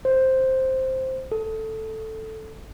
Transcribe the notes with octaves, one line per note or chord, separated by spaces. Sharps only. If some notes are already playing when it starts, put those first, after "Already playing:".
C5
A4